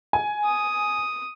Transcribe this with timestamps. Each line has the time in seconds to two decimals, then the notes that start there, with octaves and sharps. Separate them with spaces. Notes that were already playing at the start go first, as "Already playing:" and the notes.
0.13 G#5
0.44 D#6